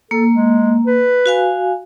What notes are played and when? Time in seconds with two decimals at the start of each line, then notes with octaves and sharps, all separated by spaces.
0.11 A#3 A4
0.32 G#3
0.87 B4
1.26 F#4 F5 G#5